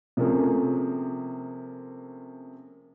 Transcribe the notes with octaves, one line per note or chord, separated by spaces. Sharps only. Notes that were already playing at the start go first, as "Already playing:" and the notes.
C3 F3 A3 A#3 C#4 G#4